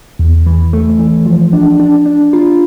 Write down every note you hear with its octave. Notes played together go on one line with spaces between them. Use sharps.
E2
E3
A3
E3
F3
D4
D4
D4
F4